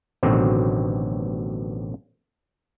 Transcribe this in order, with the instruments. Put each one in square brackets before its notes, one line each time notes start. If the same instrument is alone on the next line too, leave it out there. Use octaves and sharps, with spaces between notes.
[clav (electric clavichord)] A1 B2 D3 D#3 F#3 C4